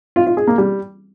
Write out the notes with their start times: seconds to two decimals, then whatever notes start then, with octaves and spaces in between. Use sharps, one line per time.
0.16 F4
0.26 F4
0.37 G#4
0.47 A#3
0.58 G3